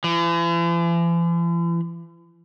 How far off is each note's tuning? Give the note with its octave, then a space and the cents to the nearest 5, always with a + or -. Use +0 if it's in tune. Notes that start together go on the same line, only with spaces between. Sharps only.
E3 +45